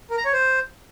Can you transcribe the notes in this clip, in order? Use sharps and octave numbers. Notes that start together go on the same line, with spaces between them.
A#4
A#5
C#5
C5